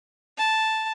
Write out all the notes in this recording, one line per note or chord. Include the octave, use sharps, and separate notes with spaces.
A5